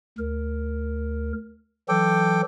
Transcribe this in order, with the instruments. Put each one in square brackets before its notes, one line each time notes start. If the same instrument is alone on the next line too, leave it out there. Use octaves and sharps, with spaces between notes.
[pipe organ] D2 A#4
[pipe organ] E3 F#3 [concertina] A4 G5 D6